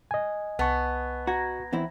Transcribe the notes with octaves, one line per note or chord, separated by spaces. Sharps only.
D#5 G#5
C2 B3 A5 C#6
F#4 A#5 G#6 A#6
E2 C4 E4